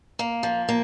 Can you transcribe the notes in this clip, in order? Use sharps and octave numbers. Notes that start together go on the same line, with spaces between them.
A#3
F3
A#3